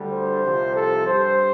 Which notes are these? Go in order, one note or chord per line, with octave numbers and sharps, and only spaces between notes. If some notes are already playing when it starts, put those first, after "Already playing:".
Already playing: D2 D3 G3
C5
C2 C3 F3
A4
G2 G3 C5